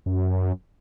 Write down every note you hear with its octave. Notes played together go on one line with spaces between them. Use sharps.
F#2